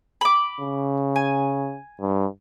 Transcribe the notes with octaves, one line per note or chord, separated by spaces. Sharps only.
B5 D6
C#3
G#5
G2